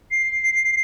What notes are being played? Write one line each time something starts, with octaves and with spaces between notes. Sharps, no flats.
C7